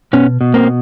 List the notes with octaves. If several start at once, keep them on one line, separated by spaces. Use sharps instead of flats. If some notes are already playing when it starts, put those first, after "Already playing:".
B2 B3 C#4
B2
A#3 C4